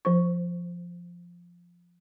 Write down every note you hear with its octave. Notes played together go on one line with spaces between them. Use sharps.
F3 C5 C#6